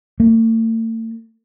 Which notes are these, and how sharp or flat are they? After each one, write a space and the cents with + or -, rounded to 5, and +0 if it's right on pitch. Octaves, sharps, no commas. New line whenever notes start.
A3 +45